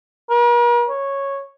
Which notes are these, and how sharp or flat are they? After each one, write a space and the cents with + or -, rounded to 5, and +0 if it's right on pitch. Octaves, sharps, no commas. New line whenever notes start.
A#4 +45
C#5 -5